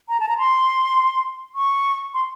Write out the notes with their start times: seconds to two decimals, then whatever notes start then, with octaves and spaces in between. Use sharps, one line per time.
0.09 A#5
0.20 A5
0.29 A#5
0.38 C6
1.55 C#6
2.14 C6